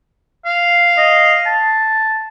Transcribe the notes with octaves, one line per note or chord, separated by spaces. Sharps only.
F5
D#5
A5